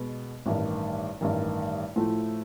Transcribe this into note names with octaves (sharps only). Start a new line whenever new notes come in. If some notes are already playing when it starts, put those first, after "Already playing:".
Already playing: B2 G#3 B3
A1 G2 D#3
A1 G2 D#3
A2 F3 A3